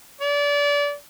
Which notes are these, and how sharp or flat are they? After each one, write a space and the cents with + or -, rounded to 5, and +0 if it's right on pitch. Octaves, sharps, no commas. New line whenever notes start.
D5 -30